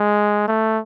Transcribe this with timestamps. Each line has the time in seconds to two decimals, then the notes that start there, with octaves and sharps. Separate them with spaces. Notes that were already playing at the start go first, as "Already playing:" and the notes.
Already playing: G#3
0.48 A3